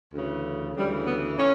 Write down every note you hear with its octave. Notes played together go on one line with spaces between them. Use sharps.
D2 C#3 E3
D2 C#3 E3 G3
B3
A2 C#4